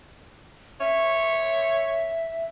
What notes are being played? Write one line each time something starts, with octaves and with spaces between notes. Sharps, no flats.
C#5 E5